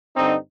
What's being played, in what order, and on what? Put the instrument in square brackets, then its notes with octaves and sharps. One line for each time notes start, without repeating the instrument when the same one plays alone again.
[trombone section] G2 D3 C4 D#4